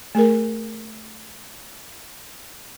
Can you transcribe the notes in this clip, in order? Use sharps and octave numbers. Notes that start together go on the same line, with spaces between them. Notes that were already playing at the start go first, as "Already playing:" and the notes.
A3 G#4 A#4